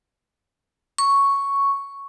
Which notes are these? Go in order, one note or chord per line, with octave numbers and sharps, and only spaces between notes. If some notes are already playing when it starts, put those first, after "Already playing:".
C#6